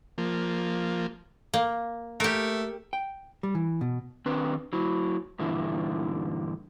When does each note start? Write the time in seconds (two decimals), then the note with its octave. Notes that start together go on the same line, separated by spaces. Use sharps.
0.18 F3 A#3
1.54 A#3
2.20 A3 G4 A#4
2.93 G5
3.43 G3
3.55 E3
3.81 B2
4.26 D#3 C4 D4 B4
4.73 F#3 E4
5.39 G2 A#2 D3 E3 E4